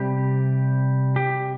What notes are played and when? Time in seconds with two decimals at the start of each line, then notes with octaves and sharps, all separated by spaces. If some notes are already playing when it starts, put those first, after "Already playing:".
Already playing: C3 G3 G4
1.16 G4